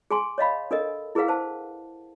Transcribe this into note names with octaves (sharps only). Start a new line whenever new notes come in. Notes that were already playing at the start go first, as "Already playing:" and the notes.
G#4 G#5 C6
C#5 D#5 F5 B5
D4 A4 A#4 D#5
E4 G#4 A#4 B4 F5 F#5
C5 A5